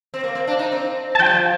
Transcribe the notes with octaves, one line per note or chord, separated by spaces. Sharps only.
C4
A#3
C4
D4
D#4
C4
A5
F3 G5
G3
F3